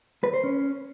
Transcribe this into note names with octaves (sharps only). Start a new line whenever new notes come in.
B4
C5
C#4